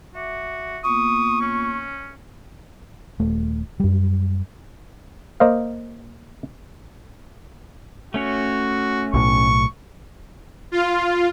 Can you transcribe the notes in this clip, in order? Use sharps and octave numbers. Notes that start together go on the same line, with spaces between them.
F#4 E5 D6
A#3 B3 F4 C#6 D#6
C#4
D#1 A3
F#2 G3
A#3 C5 D#5 F5
A3 C#4 F#4 C#5
B1 A2 C#6
F4